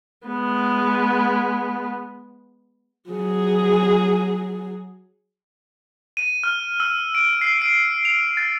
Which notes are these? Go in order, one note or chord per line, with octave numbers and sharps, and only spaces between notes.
G#3 B3
F#3 G#4
D#7
F6
E6
D7
C7
D7
F7
A6